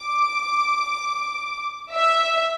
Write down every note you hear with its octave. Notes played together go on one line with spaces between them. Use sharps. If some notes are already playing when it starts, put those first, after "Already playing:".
Already playing: D6
E5